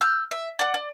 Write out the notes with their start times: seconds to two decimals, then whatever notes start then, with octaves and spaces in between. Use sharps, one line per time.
0.01 E6 F6 G6
0.31 E5
0.59 D5 F#5
0.74 D5